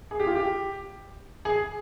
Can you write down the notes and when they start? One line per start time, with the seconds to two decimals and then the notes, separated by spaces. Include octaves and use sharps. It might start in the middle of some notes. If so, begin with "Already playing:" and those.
0.11 G#4
0.20 G4
0.26 F4
0.35 G4
1.45 G#4